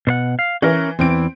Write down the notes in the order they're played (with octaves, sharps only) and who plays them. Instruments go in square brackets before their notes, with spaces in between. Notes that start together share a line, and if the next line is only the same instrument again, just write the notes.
[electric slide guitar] B2 C5 F#5
F5
[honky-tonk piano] E3 [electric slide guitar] C#4 A#4
[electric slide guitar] E2 D3 E3 [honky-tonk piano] C4 D7